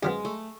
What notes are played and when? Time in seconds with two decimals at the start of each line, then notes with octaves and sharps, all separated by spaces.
0.02 F#2 F3 G#3 B3
0.25 A3